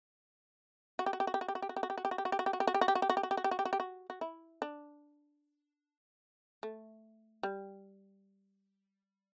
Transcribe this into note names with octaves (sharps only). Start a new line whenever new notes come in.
F#4
G4
F#4
G4
F#4
G4
F#4
G4
F#4
G4
F#4
G4
F#4
G4
F#4
G4
F#4
G4
F#4
G4
F#4
G4
F#4
G4
F#4
G4
F#4
G4
F#4
G4
F#4
G4
F#4
G4
F#4
G4
F#4
G4
F#4
G4
F#4
F#4
E4
D4
A3
G3